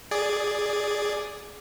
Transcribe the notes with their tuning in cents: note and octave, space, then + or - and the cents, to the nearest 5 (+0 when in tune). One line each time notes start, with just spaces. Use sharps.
G#4 +0 D5 +0